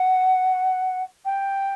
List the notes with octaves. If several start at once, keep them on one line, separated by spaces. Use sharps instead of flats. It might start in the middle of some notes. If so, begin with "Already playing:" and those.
Already playing: F#5
G5